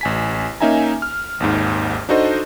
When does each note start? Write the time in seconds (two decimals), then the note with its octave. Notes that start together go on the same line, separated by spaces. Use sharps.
0.01 A1 G#5 B6
0.60 A#3 C#4 D#4 E5 G#5 A#5
1.02 F6
1.40 G#1 D#2 G#2
2.09 D4 D#4 F#4 A4 C5 D#5